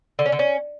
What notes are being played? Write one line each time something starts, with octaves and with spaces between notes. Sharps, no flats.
D3
C#4
D3
C#4